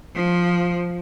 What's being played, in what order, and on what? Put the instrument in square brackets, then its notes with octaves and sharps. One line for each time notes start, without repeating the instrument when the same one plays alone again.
[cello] F3